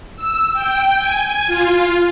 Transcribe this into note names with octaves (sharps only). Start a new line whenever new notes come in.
E6
G5
G#5
F4